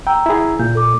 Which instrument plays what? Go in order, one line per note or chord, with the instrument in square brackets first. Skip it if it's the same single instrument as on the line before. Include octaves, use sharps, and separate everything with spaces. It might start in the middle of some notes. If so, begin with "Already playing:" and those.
[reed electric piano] G5 [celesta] A#5 E6
[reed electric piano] E4 G#4
[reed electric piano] A#2 [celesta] G6
[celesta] A4 D6